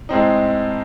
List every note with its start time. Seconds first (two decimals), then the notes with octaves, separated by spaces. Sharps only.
0.09 A2 G#3 C4 D#4